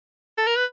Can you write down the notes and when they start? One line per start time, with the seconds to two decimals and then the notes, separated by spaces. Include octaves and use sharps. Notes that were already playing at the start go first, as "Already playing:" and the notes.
0.38 A4
0.47 A#4
0.57 B4